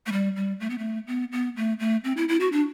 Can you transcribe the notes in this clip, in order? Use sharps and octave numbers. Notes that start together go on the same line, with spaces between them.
A3
G3
G3
A3
B3
A3
B3
B3
A3
A3
C4
E4
E4
F#4
D4